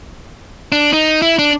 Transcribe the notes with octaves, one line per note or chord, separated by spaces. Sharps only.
D4
D#4
E4
D4